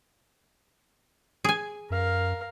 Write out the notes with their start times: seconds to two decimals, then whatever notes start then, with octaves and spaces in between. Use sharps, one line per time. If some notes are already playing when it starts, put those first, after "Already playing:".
1.44 G#4 G#5
1.90 F#2 A#4 F5